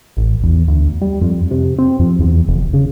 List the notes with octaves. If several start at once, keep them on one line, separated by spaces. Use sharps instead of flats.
A1
E2
D2
G3
F2
C3
C4
F2
E2
F1
C#3